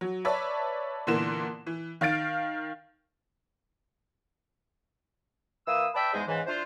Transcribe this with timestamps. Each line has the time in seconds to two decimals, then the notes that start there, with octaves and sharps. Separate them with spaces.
0.01 F#3
0.25 B4 C#5 D5 E5 A5
1.07 A#2 D3 E3 B3 A#4 E7
1.66 E3
2.01 D#3 F5 F6 A6 D7
5.66 E3 A#3 D#6 E6
5.95 B4 D5 E5 G5 A5
6.13 E2 G#2 G#3 G#4 C5
6.28 G#2 C#3 E3
6.46 D4 E4 F4 C5